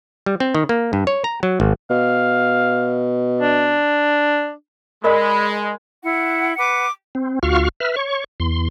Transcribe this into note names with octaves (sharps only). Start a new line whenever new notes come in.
G3
C4
D#3
A#3
G2
C#5
A#5
F#3
G#1
B2 F5
D4
G#3 A#4 D5 D#5 B5
E4 F#5
B4 F#5 D6
C4
D2 F4 F#4 F5 C#6 F6
B4 E5 F6
C#5 C#6
E2 C6